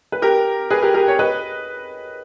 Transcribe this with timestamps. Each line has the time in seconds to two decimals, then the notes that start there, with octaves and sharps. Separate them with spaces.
0.12 B4
0.22 G4 A#4
0.70 G#4 B4
0.82 G4 A#4
0.94 G4 A#4
1.08 C#5
1.19 B4 D#5